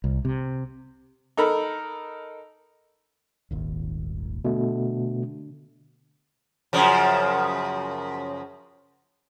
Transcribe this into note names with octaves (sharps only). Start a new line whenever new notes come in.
C2
C3
D#4 A4 A#4 B5
D#1 G#1 D#2
B2 D3 A3
F#2 C#3 F3